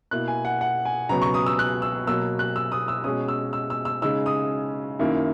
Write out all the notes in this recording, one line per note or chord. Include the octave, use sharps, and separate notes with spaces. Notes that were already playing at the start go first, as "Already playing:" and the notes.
B2 A#3 E4 F#6
G#5
F#5
F#5
G#5
C#2 B2 F#3 B3 A#5
C#6
D#6
E6
F#6
E6
B2 F#3 A#3 E6
F#6
E6
D#6
E6
B2 G#3 C#4 D#6
E6
E6
E6
E6
C#3 G#3 D#4 E6
D#6
F#2 D#3 A#3 E4